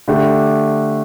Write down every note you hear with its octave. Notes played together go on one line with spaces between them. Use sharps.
D3 A3 D4 G4